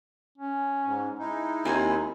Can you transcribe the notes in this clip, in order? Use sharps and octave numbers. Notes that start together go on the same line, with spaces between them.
C#4
G#2
G#3 D#4 E4
D#2 C4 G#5